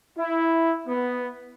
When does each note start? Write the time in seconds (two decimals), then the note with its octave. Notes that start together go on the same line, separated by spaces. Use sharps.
0.18 E4
0.87 B3